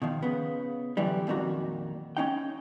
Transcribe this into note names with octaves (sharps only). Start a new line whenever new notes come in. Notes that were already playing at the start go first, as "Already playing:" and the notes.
B2 D#3 F3
C#3 B3
F#2 D3 E3 G3
F2 A#2 D#3 F#4 A#5
C#4 D#4 G5